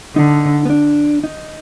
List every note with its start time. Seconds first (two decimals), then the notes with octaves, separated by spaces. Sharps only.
0.16 D3 D#4
0.65 B3
0.70 D4
1.24 D#4